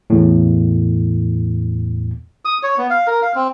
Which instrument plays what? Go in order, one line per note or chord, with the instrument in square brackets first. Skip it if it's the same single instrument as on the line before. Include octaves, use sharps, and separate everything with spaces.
[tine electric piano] E2 A2
[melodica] D#6
C#5
B3
F5
A#4
F5
C4